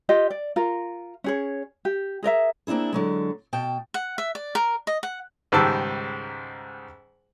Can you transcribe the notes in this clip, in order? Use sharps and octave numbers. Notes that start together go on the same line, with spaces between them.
F4 G4 D#5
D5
F4 A#4
C#4 G#4 C#5
G4
G#4 A#4 D5 E5
A#3 C4 D4 E4 G#4
D3 F#3 G#3
B2 G5 A5
F#5
E5
D5
A#4
D#5
F#5
C#2 G#2 D#3 G3 A5 E6